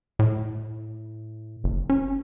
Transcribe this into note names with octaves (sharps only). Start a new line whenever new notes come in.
A2
F#1
C#4